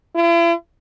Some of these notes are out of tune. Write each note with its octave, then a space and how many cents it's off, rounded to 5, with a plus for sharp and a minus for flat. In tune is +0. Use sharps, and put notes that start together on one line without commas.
E4 +45